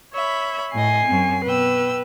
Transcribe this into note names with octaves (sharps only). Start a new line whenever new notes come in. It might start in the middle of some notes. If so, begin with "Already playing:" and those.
C#5 E5 B5
A2 D#5 G#5 C7
F#2 C4
B2 B4 G5 E6